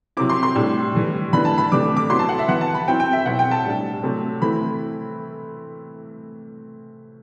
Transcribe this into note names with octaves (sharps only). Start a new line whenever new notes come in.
C3 F#3 C4 E4 D6
C6
C6
A2 G3 D4
A2 E3 G3
A2 E3 B3 D4 B5
A5
B5
C3 E3 A3 D4 D6
D6
F#3 B3 E4 C6
A5
F#5
E5
E3 B3 E4 F#5
A5
B5
F#3 C4 E4 G5
G5
E5
B2 F#3 C4 E4 F#5
G5
A5
A2 G3 D4
C3 F#3 A3 C4
E3 A3 C4 E4 B5